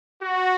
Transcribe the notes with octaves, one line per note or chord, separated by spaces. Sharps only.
F#4